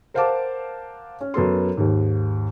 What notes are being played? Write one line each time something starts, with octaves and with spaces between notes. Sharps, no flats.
A#4 C5 F5 F#5 A5 D6
C#4
F#2 B3 A4 C6
D#2 G#2